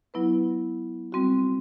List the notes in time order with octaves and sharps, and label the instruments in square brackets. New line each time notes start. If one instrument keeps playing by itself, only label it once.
[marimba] F#3 B3 E4 B4
G3 C4 F#4